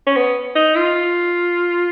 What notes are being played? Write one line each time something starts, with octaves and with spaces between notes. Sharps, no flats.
C#4
B3
D#4
F4